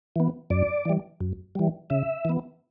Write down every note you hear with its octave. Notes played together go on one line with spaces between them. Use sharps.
E3 B3
F#2 D5
E3 G3
F#2
E3 G3
C#3 E5
E3 B3